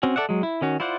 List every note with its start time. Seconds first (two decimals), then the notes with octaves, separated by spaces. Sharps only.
0.03 C4 C#4 F#4
0.16 A4 D5 E5 F#5
0.29 F#3 G#3
0.43 E4
0.61 D#3 C#4 F#4
0.80 E4 F4 C5 D5 F#5